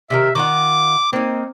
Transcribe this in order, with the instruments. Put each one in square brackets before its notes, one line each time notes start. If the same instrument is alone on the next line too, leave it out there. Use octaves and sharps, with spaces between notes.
[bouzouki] C3 D#3 A#4 [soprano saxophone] E5
[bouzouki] D#3 F4 F#5 [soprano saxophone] D6
[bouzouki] A#3 D#4 [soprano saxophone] C4